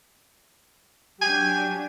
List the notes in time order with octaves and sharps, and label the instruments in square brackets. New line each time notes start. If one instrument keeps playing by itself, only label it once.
[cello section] F#3 D4 [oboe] G4 [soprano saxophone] G#5